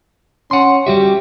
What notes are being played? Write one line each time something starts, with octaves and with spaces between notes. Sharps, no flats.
C#4 F#5 C6
G3 F#4 G4 E5